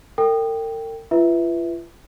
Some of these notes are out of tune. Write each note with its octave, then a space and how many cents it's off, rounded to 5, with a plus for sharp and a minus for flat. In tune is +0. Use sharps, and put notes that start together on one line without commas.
A#4 -45 G5 +0
F4 -40 B4 +0 E5 -10